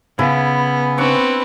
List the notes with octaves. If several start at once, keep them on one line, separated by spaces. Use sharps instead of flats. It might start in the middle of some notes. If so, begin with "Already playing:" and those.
C#3 B3 E4
C4 D4 B4 C#6